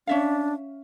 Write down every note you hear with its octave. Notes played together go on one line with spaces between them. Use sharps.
C#4 D4 E5 F5